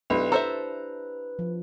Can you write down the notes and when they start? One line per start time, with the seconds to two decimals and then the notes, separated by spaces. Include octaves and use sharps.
0.10 B1 D4 E4 G4 B4
0.32 A4 C5 E5 A#5
1.39 F3